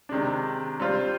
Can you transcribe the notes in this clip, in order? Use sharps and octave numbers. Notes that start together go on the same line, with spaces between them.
C3 D#3 G#3 D4
G3 C4 F4 C5